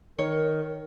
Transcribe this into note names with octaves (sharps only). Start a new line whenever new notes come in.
D#3 A#4 C#5